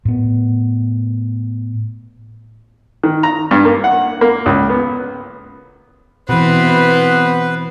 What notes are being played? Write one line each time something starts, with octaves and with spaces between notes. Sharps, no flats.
A2 B3
D#3
A#5
G2
A#3
F#5
A#3
C#2
B3
B2 E3 B3 C4 B4